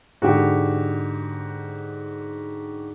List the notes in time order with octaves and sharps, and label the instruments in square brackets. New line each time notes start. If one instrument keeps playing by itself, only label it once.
[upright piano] G#2 D3 [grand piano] F#4 G4